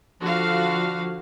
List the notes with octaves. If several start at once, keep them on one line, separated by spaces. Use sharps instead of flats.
D3 F3 F#4 F5